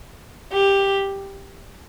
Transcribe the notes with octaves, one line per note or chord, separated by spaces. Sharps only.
G4